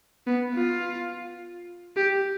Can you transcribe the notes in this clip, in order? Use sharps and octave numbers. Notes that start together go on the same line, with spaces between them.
B3
F4
G4